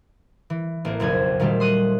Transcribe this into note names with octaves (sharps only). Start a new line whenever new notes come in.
E3
A1 A#3 C4
F#1 B1 F2 G#6
A#2 D#3 F#3 G3 A3 G4
C6 D#6 F#6 D#7